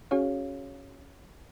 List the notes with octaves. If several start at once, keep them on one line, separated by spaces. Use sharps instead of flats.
C#4 F#4 G#4 C#5 F5